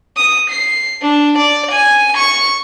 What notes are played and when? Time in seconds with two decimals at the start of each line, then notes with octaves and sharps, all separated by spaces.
0.17 D#6
0.50 C7
1.02 D4
1.38 D5
1.72 G#5
2.17 C#6